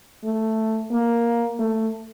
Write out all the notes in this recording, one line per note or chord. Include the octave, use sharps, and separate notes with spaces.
A3
A#3
A3